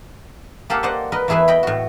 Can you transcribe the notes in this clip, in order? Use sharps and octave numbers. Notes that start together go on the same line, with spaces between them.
A#3 G4 A4 F5 F#5
C5 D5 D#5 F#5
A#4 B4 D#5
E2 A3 E4 G#4 B4 E5
D#5 G5 B5
A2 F#4